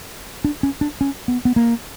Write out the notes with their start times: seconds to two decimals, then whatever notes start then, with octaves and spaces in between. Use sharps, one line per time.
0.45 D4
0.63 C#4
0.81 D4
1.01 C#4
1.28 B3
1.45 B3
1.56 A#3